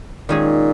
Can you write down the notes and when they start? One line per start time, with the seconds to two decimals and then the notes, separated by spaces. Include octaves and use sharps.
0.29 A#2 D#3 G#3 C#4 G#4